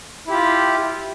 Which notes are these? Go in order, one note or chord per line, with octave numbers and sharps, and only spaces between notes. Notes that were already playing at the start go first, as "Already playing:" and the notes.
E4 F4 G4